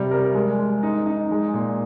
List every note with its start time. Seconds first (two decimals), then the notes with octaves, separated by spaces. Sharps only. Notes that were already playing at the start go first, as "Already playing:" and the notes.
Already playing: C3 G3
0.11 A#4
0.34 G#3
0.59 G#3
0.83 D#4
1.06 D#4
1.31 G#3
1.54 A#2